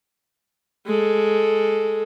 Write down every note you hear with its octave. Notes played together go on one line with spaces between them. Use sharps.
G#3 A4